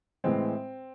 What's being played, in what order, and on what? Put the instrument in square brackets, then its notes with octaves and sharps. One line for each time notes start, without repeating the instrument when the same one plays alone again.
[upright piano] A2 E3 G#3 C4